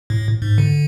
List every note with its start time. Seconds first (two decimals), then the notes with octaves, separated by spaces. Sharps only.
0.10 A2
0.42 G#2
0.58 D3